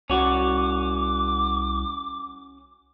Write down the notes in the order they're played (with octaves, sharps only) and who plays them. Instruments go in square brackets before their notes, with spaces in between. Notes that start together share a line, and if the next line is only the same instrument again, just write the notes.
[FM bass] C2 [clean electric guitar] C#4 F#4 [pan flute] D6